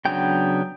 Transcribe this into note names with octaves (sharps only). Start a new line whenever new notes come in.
C#3 F#3 B3 D4 G5